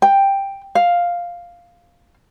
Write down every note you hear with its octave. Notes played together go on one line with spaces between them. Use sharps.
G5
F5